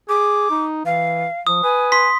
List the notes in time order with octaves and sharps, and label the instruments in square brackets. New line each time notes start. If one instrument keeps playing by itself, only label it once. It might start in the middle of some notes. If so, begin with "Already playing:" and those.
[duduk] G#4 [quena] D6
[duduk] D#4
[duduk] E3 [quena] F5
[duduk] F3 [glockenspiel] D#6
[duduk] B4 [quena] G#5
[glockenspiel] C6 B6